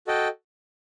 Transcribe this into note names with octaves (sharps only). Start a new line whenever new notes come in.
F#4 A4 D#5 G5